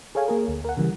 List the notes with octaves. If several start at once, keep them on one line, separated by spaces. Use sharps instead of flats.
G#4 A4 C#5 F5 G#5
A#3 G#4 A#4
D2
A#4 F#5
C#3 E3 G3